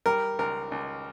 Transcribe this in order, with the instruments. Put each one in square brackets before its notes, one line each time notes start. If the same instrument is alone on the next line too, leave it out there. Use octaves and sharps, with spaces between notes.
[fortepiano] G3 A#4
C#2 A#4
C#2